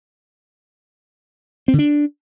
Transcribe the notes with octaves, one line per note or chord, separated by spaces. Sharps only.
C4
D3
D4